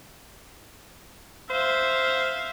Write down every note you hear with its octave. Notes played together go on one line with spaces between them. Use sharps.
C5 E5 F5